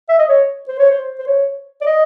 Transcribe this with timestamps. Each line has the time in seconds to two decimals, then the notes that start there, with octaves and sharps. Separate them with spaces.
0.09 E5
0.19 D#5
0.29 C#5
0.68 C5
0.79 C#5
0.91 C5
1.19 C5
1.27 C#5
1.81 D5
1.86 D#5